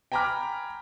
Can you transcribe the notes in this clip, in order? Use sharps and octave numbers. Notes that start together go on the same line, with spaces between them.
G5 G#5 A#5 B5 D6 F6